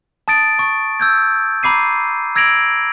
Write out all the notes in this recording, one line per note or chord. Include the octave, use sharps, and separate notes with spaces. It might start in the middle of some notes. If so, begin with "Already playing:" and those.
A5 D#6 A6 D7
C#6
E6 G6 G#6
A#5 B5 D6 C7 D#7
E6 G#6 A#6 D7 F7 F#7